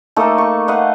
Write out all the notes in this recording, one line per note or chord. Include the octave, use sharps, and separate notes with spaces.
A3 A#3 D#4 A4
C#6
B4 D#5 F5 F#5